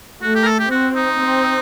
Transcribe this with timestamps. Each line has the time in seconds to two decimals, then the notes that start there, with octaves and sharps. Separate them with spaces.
0.22 A3 F#4
0.35 G4
0.43 A#4
0.46 A4
0.59 G4
0.70 C4 F#4
0.95 D#4
1.20 C4